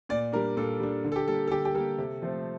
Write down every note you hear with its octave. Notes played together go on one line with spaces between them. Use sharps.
A#2 D5
G3 D4 A#4
A#2 A4
G3 D4
D3
A4
G4
G3 A#3 A4
A4
D3 G4
G4
G3 A#3 A4
C3
F3 A3 C4